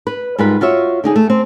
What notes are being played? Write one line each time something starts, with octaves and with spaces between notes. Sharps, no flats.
B4
G#2 G3 F4 A#4 B4
F4 F#4 C#5 E5
D3 D#4 G#4
A3
C4